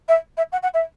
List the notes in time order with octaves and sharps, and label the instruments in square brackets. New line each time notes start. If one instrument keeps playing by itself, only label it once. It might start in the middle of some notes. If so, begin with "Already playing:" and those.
[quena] E5
E5
F#5
F#5
E5